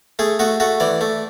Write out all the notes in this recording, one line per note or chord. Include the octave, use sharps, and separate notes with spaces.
A3 G#4
A3 F#4
A3 F#4
E3 D5
A3